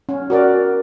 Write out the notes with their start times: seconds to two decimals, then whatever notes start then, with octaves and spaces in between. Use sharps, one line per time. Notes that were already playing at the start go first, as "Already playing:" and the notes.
0.09 C#4
0.30 F#4 A#4 D5